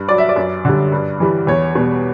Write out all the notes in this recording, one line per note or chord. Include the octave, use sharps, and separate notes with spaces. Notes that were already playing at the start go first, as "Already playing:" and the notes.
Already playing: G2
F#3 D5
E5
D5
F#2
D3 G3
G2
E3 G3
E2 C#5
B2 G3